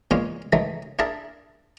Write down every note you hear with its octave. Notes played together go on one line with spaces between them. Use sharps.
E2 A#2 G#3 F4 C#5 F5
D#3 E3 F#3 G#3 A3
D4 E4 G#4 A#4 E5 A5